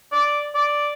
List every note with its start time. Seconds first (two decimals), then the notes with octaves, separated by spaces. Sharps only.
0.12 D5
0.55 D5